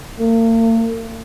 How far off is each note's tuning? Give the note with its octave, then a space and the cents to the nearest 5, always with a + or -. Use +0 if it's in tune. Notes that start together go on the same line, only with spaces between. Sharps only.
A#3 -45